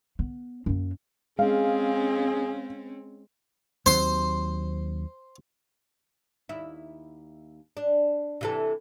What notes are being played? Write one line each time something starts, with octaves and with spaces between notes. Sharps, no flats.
B3
F#2 A#3
G#3 C4 C#4 G#4 F5
D#2 F#3 C4 C5 C6
D#2 E4
D4
C3 E3 A4